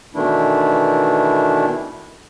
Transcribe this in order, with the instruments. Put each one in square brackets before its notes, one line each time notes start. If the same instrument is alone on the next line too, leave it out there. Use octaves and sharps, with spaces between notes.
[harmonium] B2 D#3 E3 A3 D4 E4